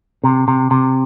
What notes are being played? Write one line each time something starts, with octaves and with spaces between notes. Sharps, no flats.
C3
C3
C3